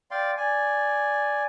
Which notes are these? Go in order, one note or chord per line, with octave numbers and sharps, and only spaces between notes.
D5 F5 G5 C6
D5 G#5